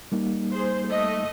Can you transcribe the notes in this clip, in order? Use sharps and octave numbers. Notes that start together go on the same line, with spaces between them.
G3 A#3 D#4
G#4 C5
A3 D#5